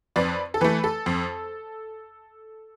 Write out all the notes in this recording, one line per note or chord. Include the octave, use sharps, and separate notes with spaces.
F2 B4 D5
A4
E3 A3 B4
A4
F2